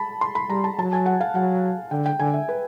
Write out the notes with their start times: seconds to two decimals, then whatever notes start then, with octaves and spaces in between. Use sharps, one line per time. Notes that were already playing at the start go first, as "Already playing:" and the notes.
Already playing: A5 B5
0.21 C6
0.35 B5
0.50 G3 A#5
0.64 A5
0.78 F#3 A5
0.93 G#5
1.06 F#5
1.21 F5
1.35 F#3 F#5
1.91 D3 G5
2.06 G5
2.19 D3 G#5
2.34 E5
2.49 B4